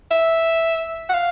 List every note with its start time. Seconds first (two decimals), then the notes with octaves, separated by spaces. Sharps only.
0.11 E5
1.09 F#5
1.14 F5